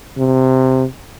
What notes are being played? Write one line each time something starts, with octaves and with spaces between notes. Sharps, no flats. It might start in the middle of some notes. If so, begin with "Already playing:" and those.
C3